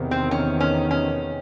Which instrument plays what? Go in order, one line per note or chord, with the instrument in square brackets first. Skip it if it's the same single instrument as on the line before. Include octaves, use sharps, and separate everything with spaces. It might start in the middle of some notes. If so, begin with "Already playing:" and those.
Already playing: [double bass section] E2 C3 D#3
[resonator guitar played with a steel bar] C4
C#4
C#4
C#4